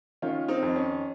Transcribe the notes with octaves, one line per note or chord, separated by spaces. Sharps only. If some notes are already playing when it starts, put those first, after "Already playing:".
D#3 C#4 F4
C4 D#4
F2
C#4